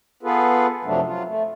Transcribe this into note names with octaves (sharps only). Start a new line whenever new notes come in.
B3 F4 G#4 A4 B4
F#2 C3 F3 F#3 A3 D4
F#3 F4
A3